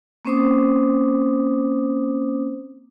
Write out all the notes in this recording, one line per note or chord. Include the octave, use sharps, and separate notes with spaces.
A#3 C4 C#4 C5 D6 D#6